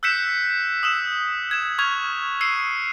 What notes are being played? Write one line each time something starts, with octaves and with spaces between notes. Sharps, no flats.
E6 F#6 G6 B6 C#7 E7
D#6 E6 E7
G#6 E7
C#6 F6 G#6 F7
E6 C7 C#7 D#7